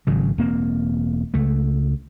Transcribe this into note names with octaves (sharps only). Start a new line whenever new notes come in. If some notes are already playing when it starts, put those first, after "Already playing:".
G#1 C#3 F#3
E1 A#3 C4
C#2 A3